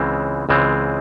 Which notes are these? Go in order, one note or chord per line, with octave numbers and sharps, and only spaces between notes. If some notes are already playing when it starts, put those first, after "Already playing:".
Already playing: C#2 C#3 E3 G#3 C4
C#2 C#3 E3 G#3 C4